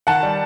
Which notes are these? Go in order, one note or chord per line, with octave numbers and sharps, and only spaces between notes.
D#3 F#5 A5
G3